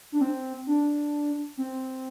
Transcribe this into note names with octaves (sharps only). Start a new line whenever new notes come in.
D4
C4
D4
C4